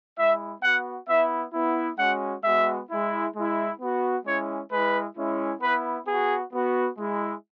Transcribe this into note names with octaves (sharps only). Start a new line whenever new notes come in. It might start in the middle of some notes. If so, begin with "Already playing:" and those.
G#3 E4 E5
B3 F#4 F#5
B3 E4 E5
B3 E4
G#3 C#4 F#4 F#5
G#3 B3 F#4 E5
G#3 E4
G#3 E4
B3 F#4
G#3 C#4 E4 C#5
G#3 E4 B4
G#3 C#4 E4
B3 E4 B4
B3 F#4 G#4
B3 F#4
G#3 E4